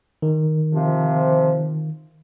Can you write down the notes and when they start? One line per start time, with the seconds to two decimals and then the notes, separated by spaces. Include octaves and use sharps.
0.22 D#3
0.74 C3 F3 F4